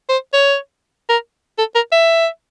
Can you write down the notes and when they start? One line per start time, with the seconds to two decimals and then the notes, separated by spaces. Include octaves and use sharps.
0.09 C5
0.33 C#5
1.09 A#4
1.58 A4
1.75 A#4
1.92 E5